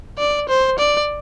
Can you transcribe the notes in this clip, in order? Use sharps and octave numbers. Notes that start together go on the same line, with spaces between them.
D5
C5
D5